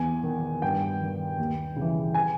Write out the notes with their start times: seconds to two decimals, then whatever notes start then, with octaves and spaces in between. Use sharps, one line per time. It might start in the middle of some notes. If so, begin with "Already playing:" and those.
Already playing: E2 G#5
0.23 D#3
0.62 G2 G5
1.01 D#3
1.38 D#2
1.76 C#3 E3
2.14 G#5